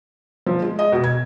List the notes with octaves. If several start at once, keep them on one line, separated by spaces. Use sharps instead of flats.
F3
G#3
D#5
B2
G#6